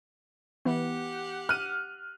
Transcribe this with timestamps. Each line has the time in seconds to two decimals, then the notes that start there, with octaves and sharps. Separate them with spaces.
0.65 E3 B3 G4 F#5
1.49 F6 F#6 D#7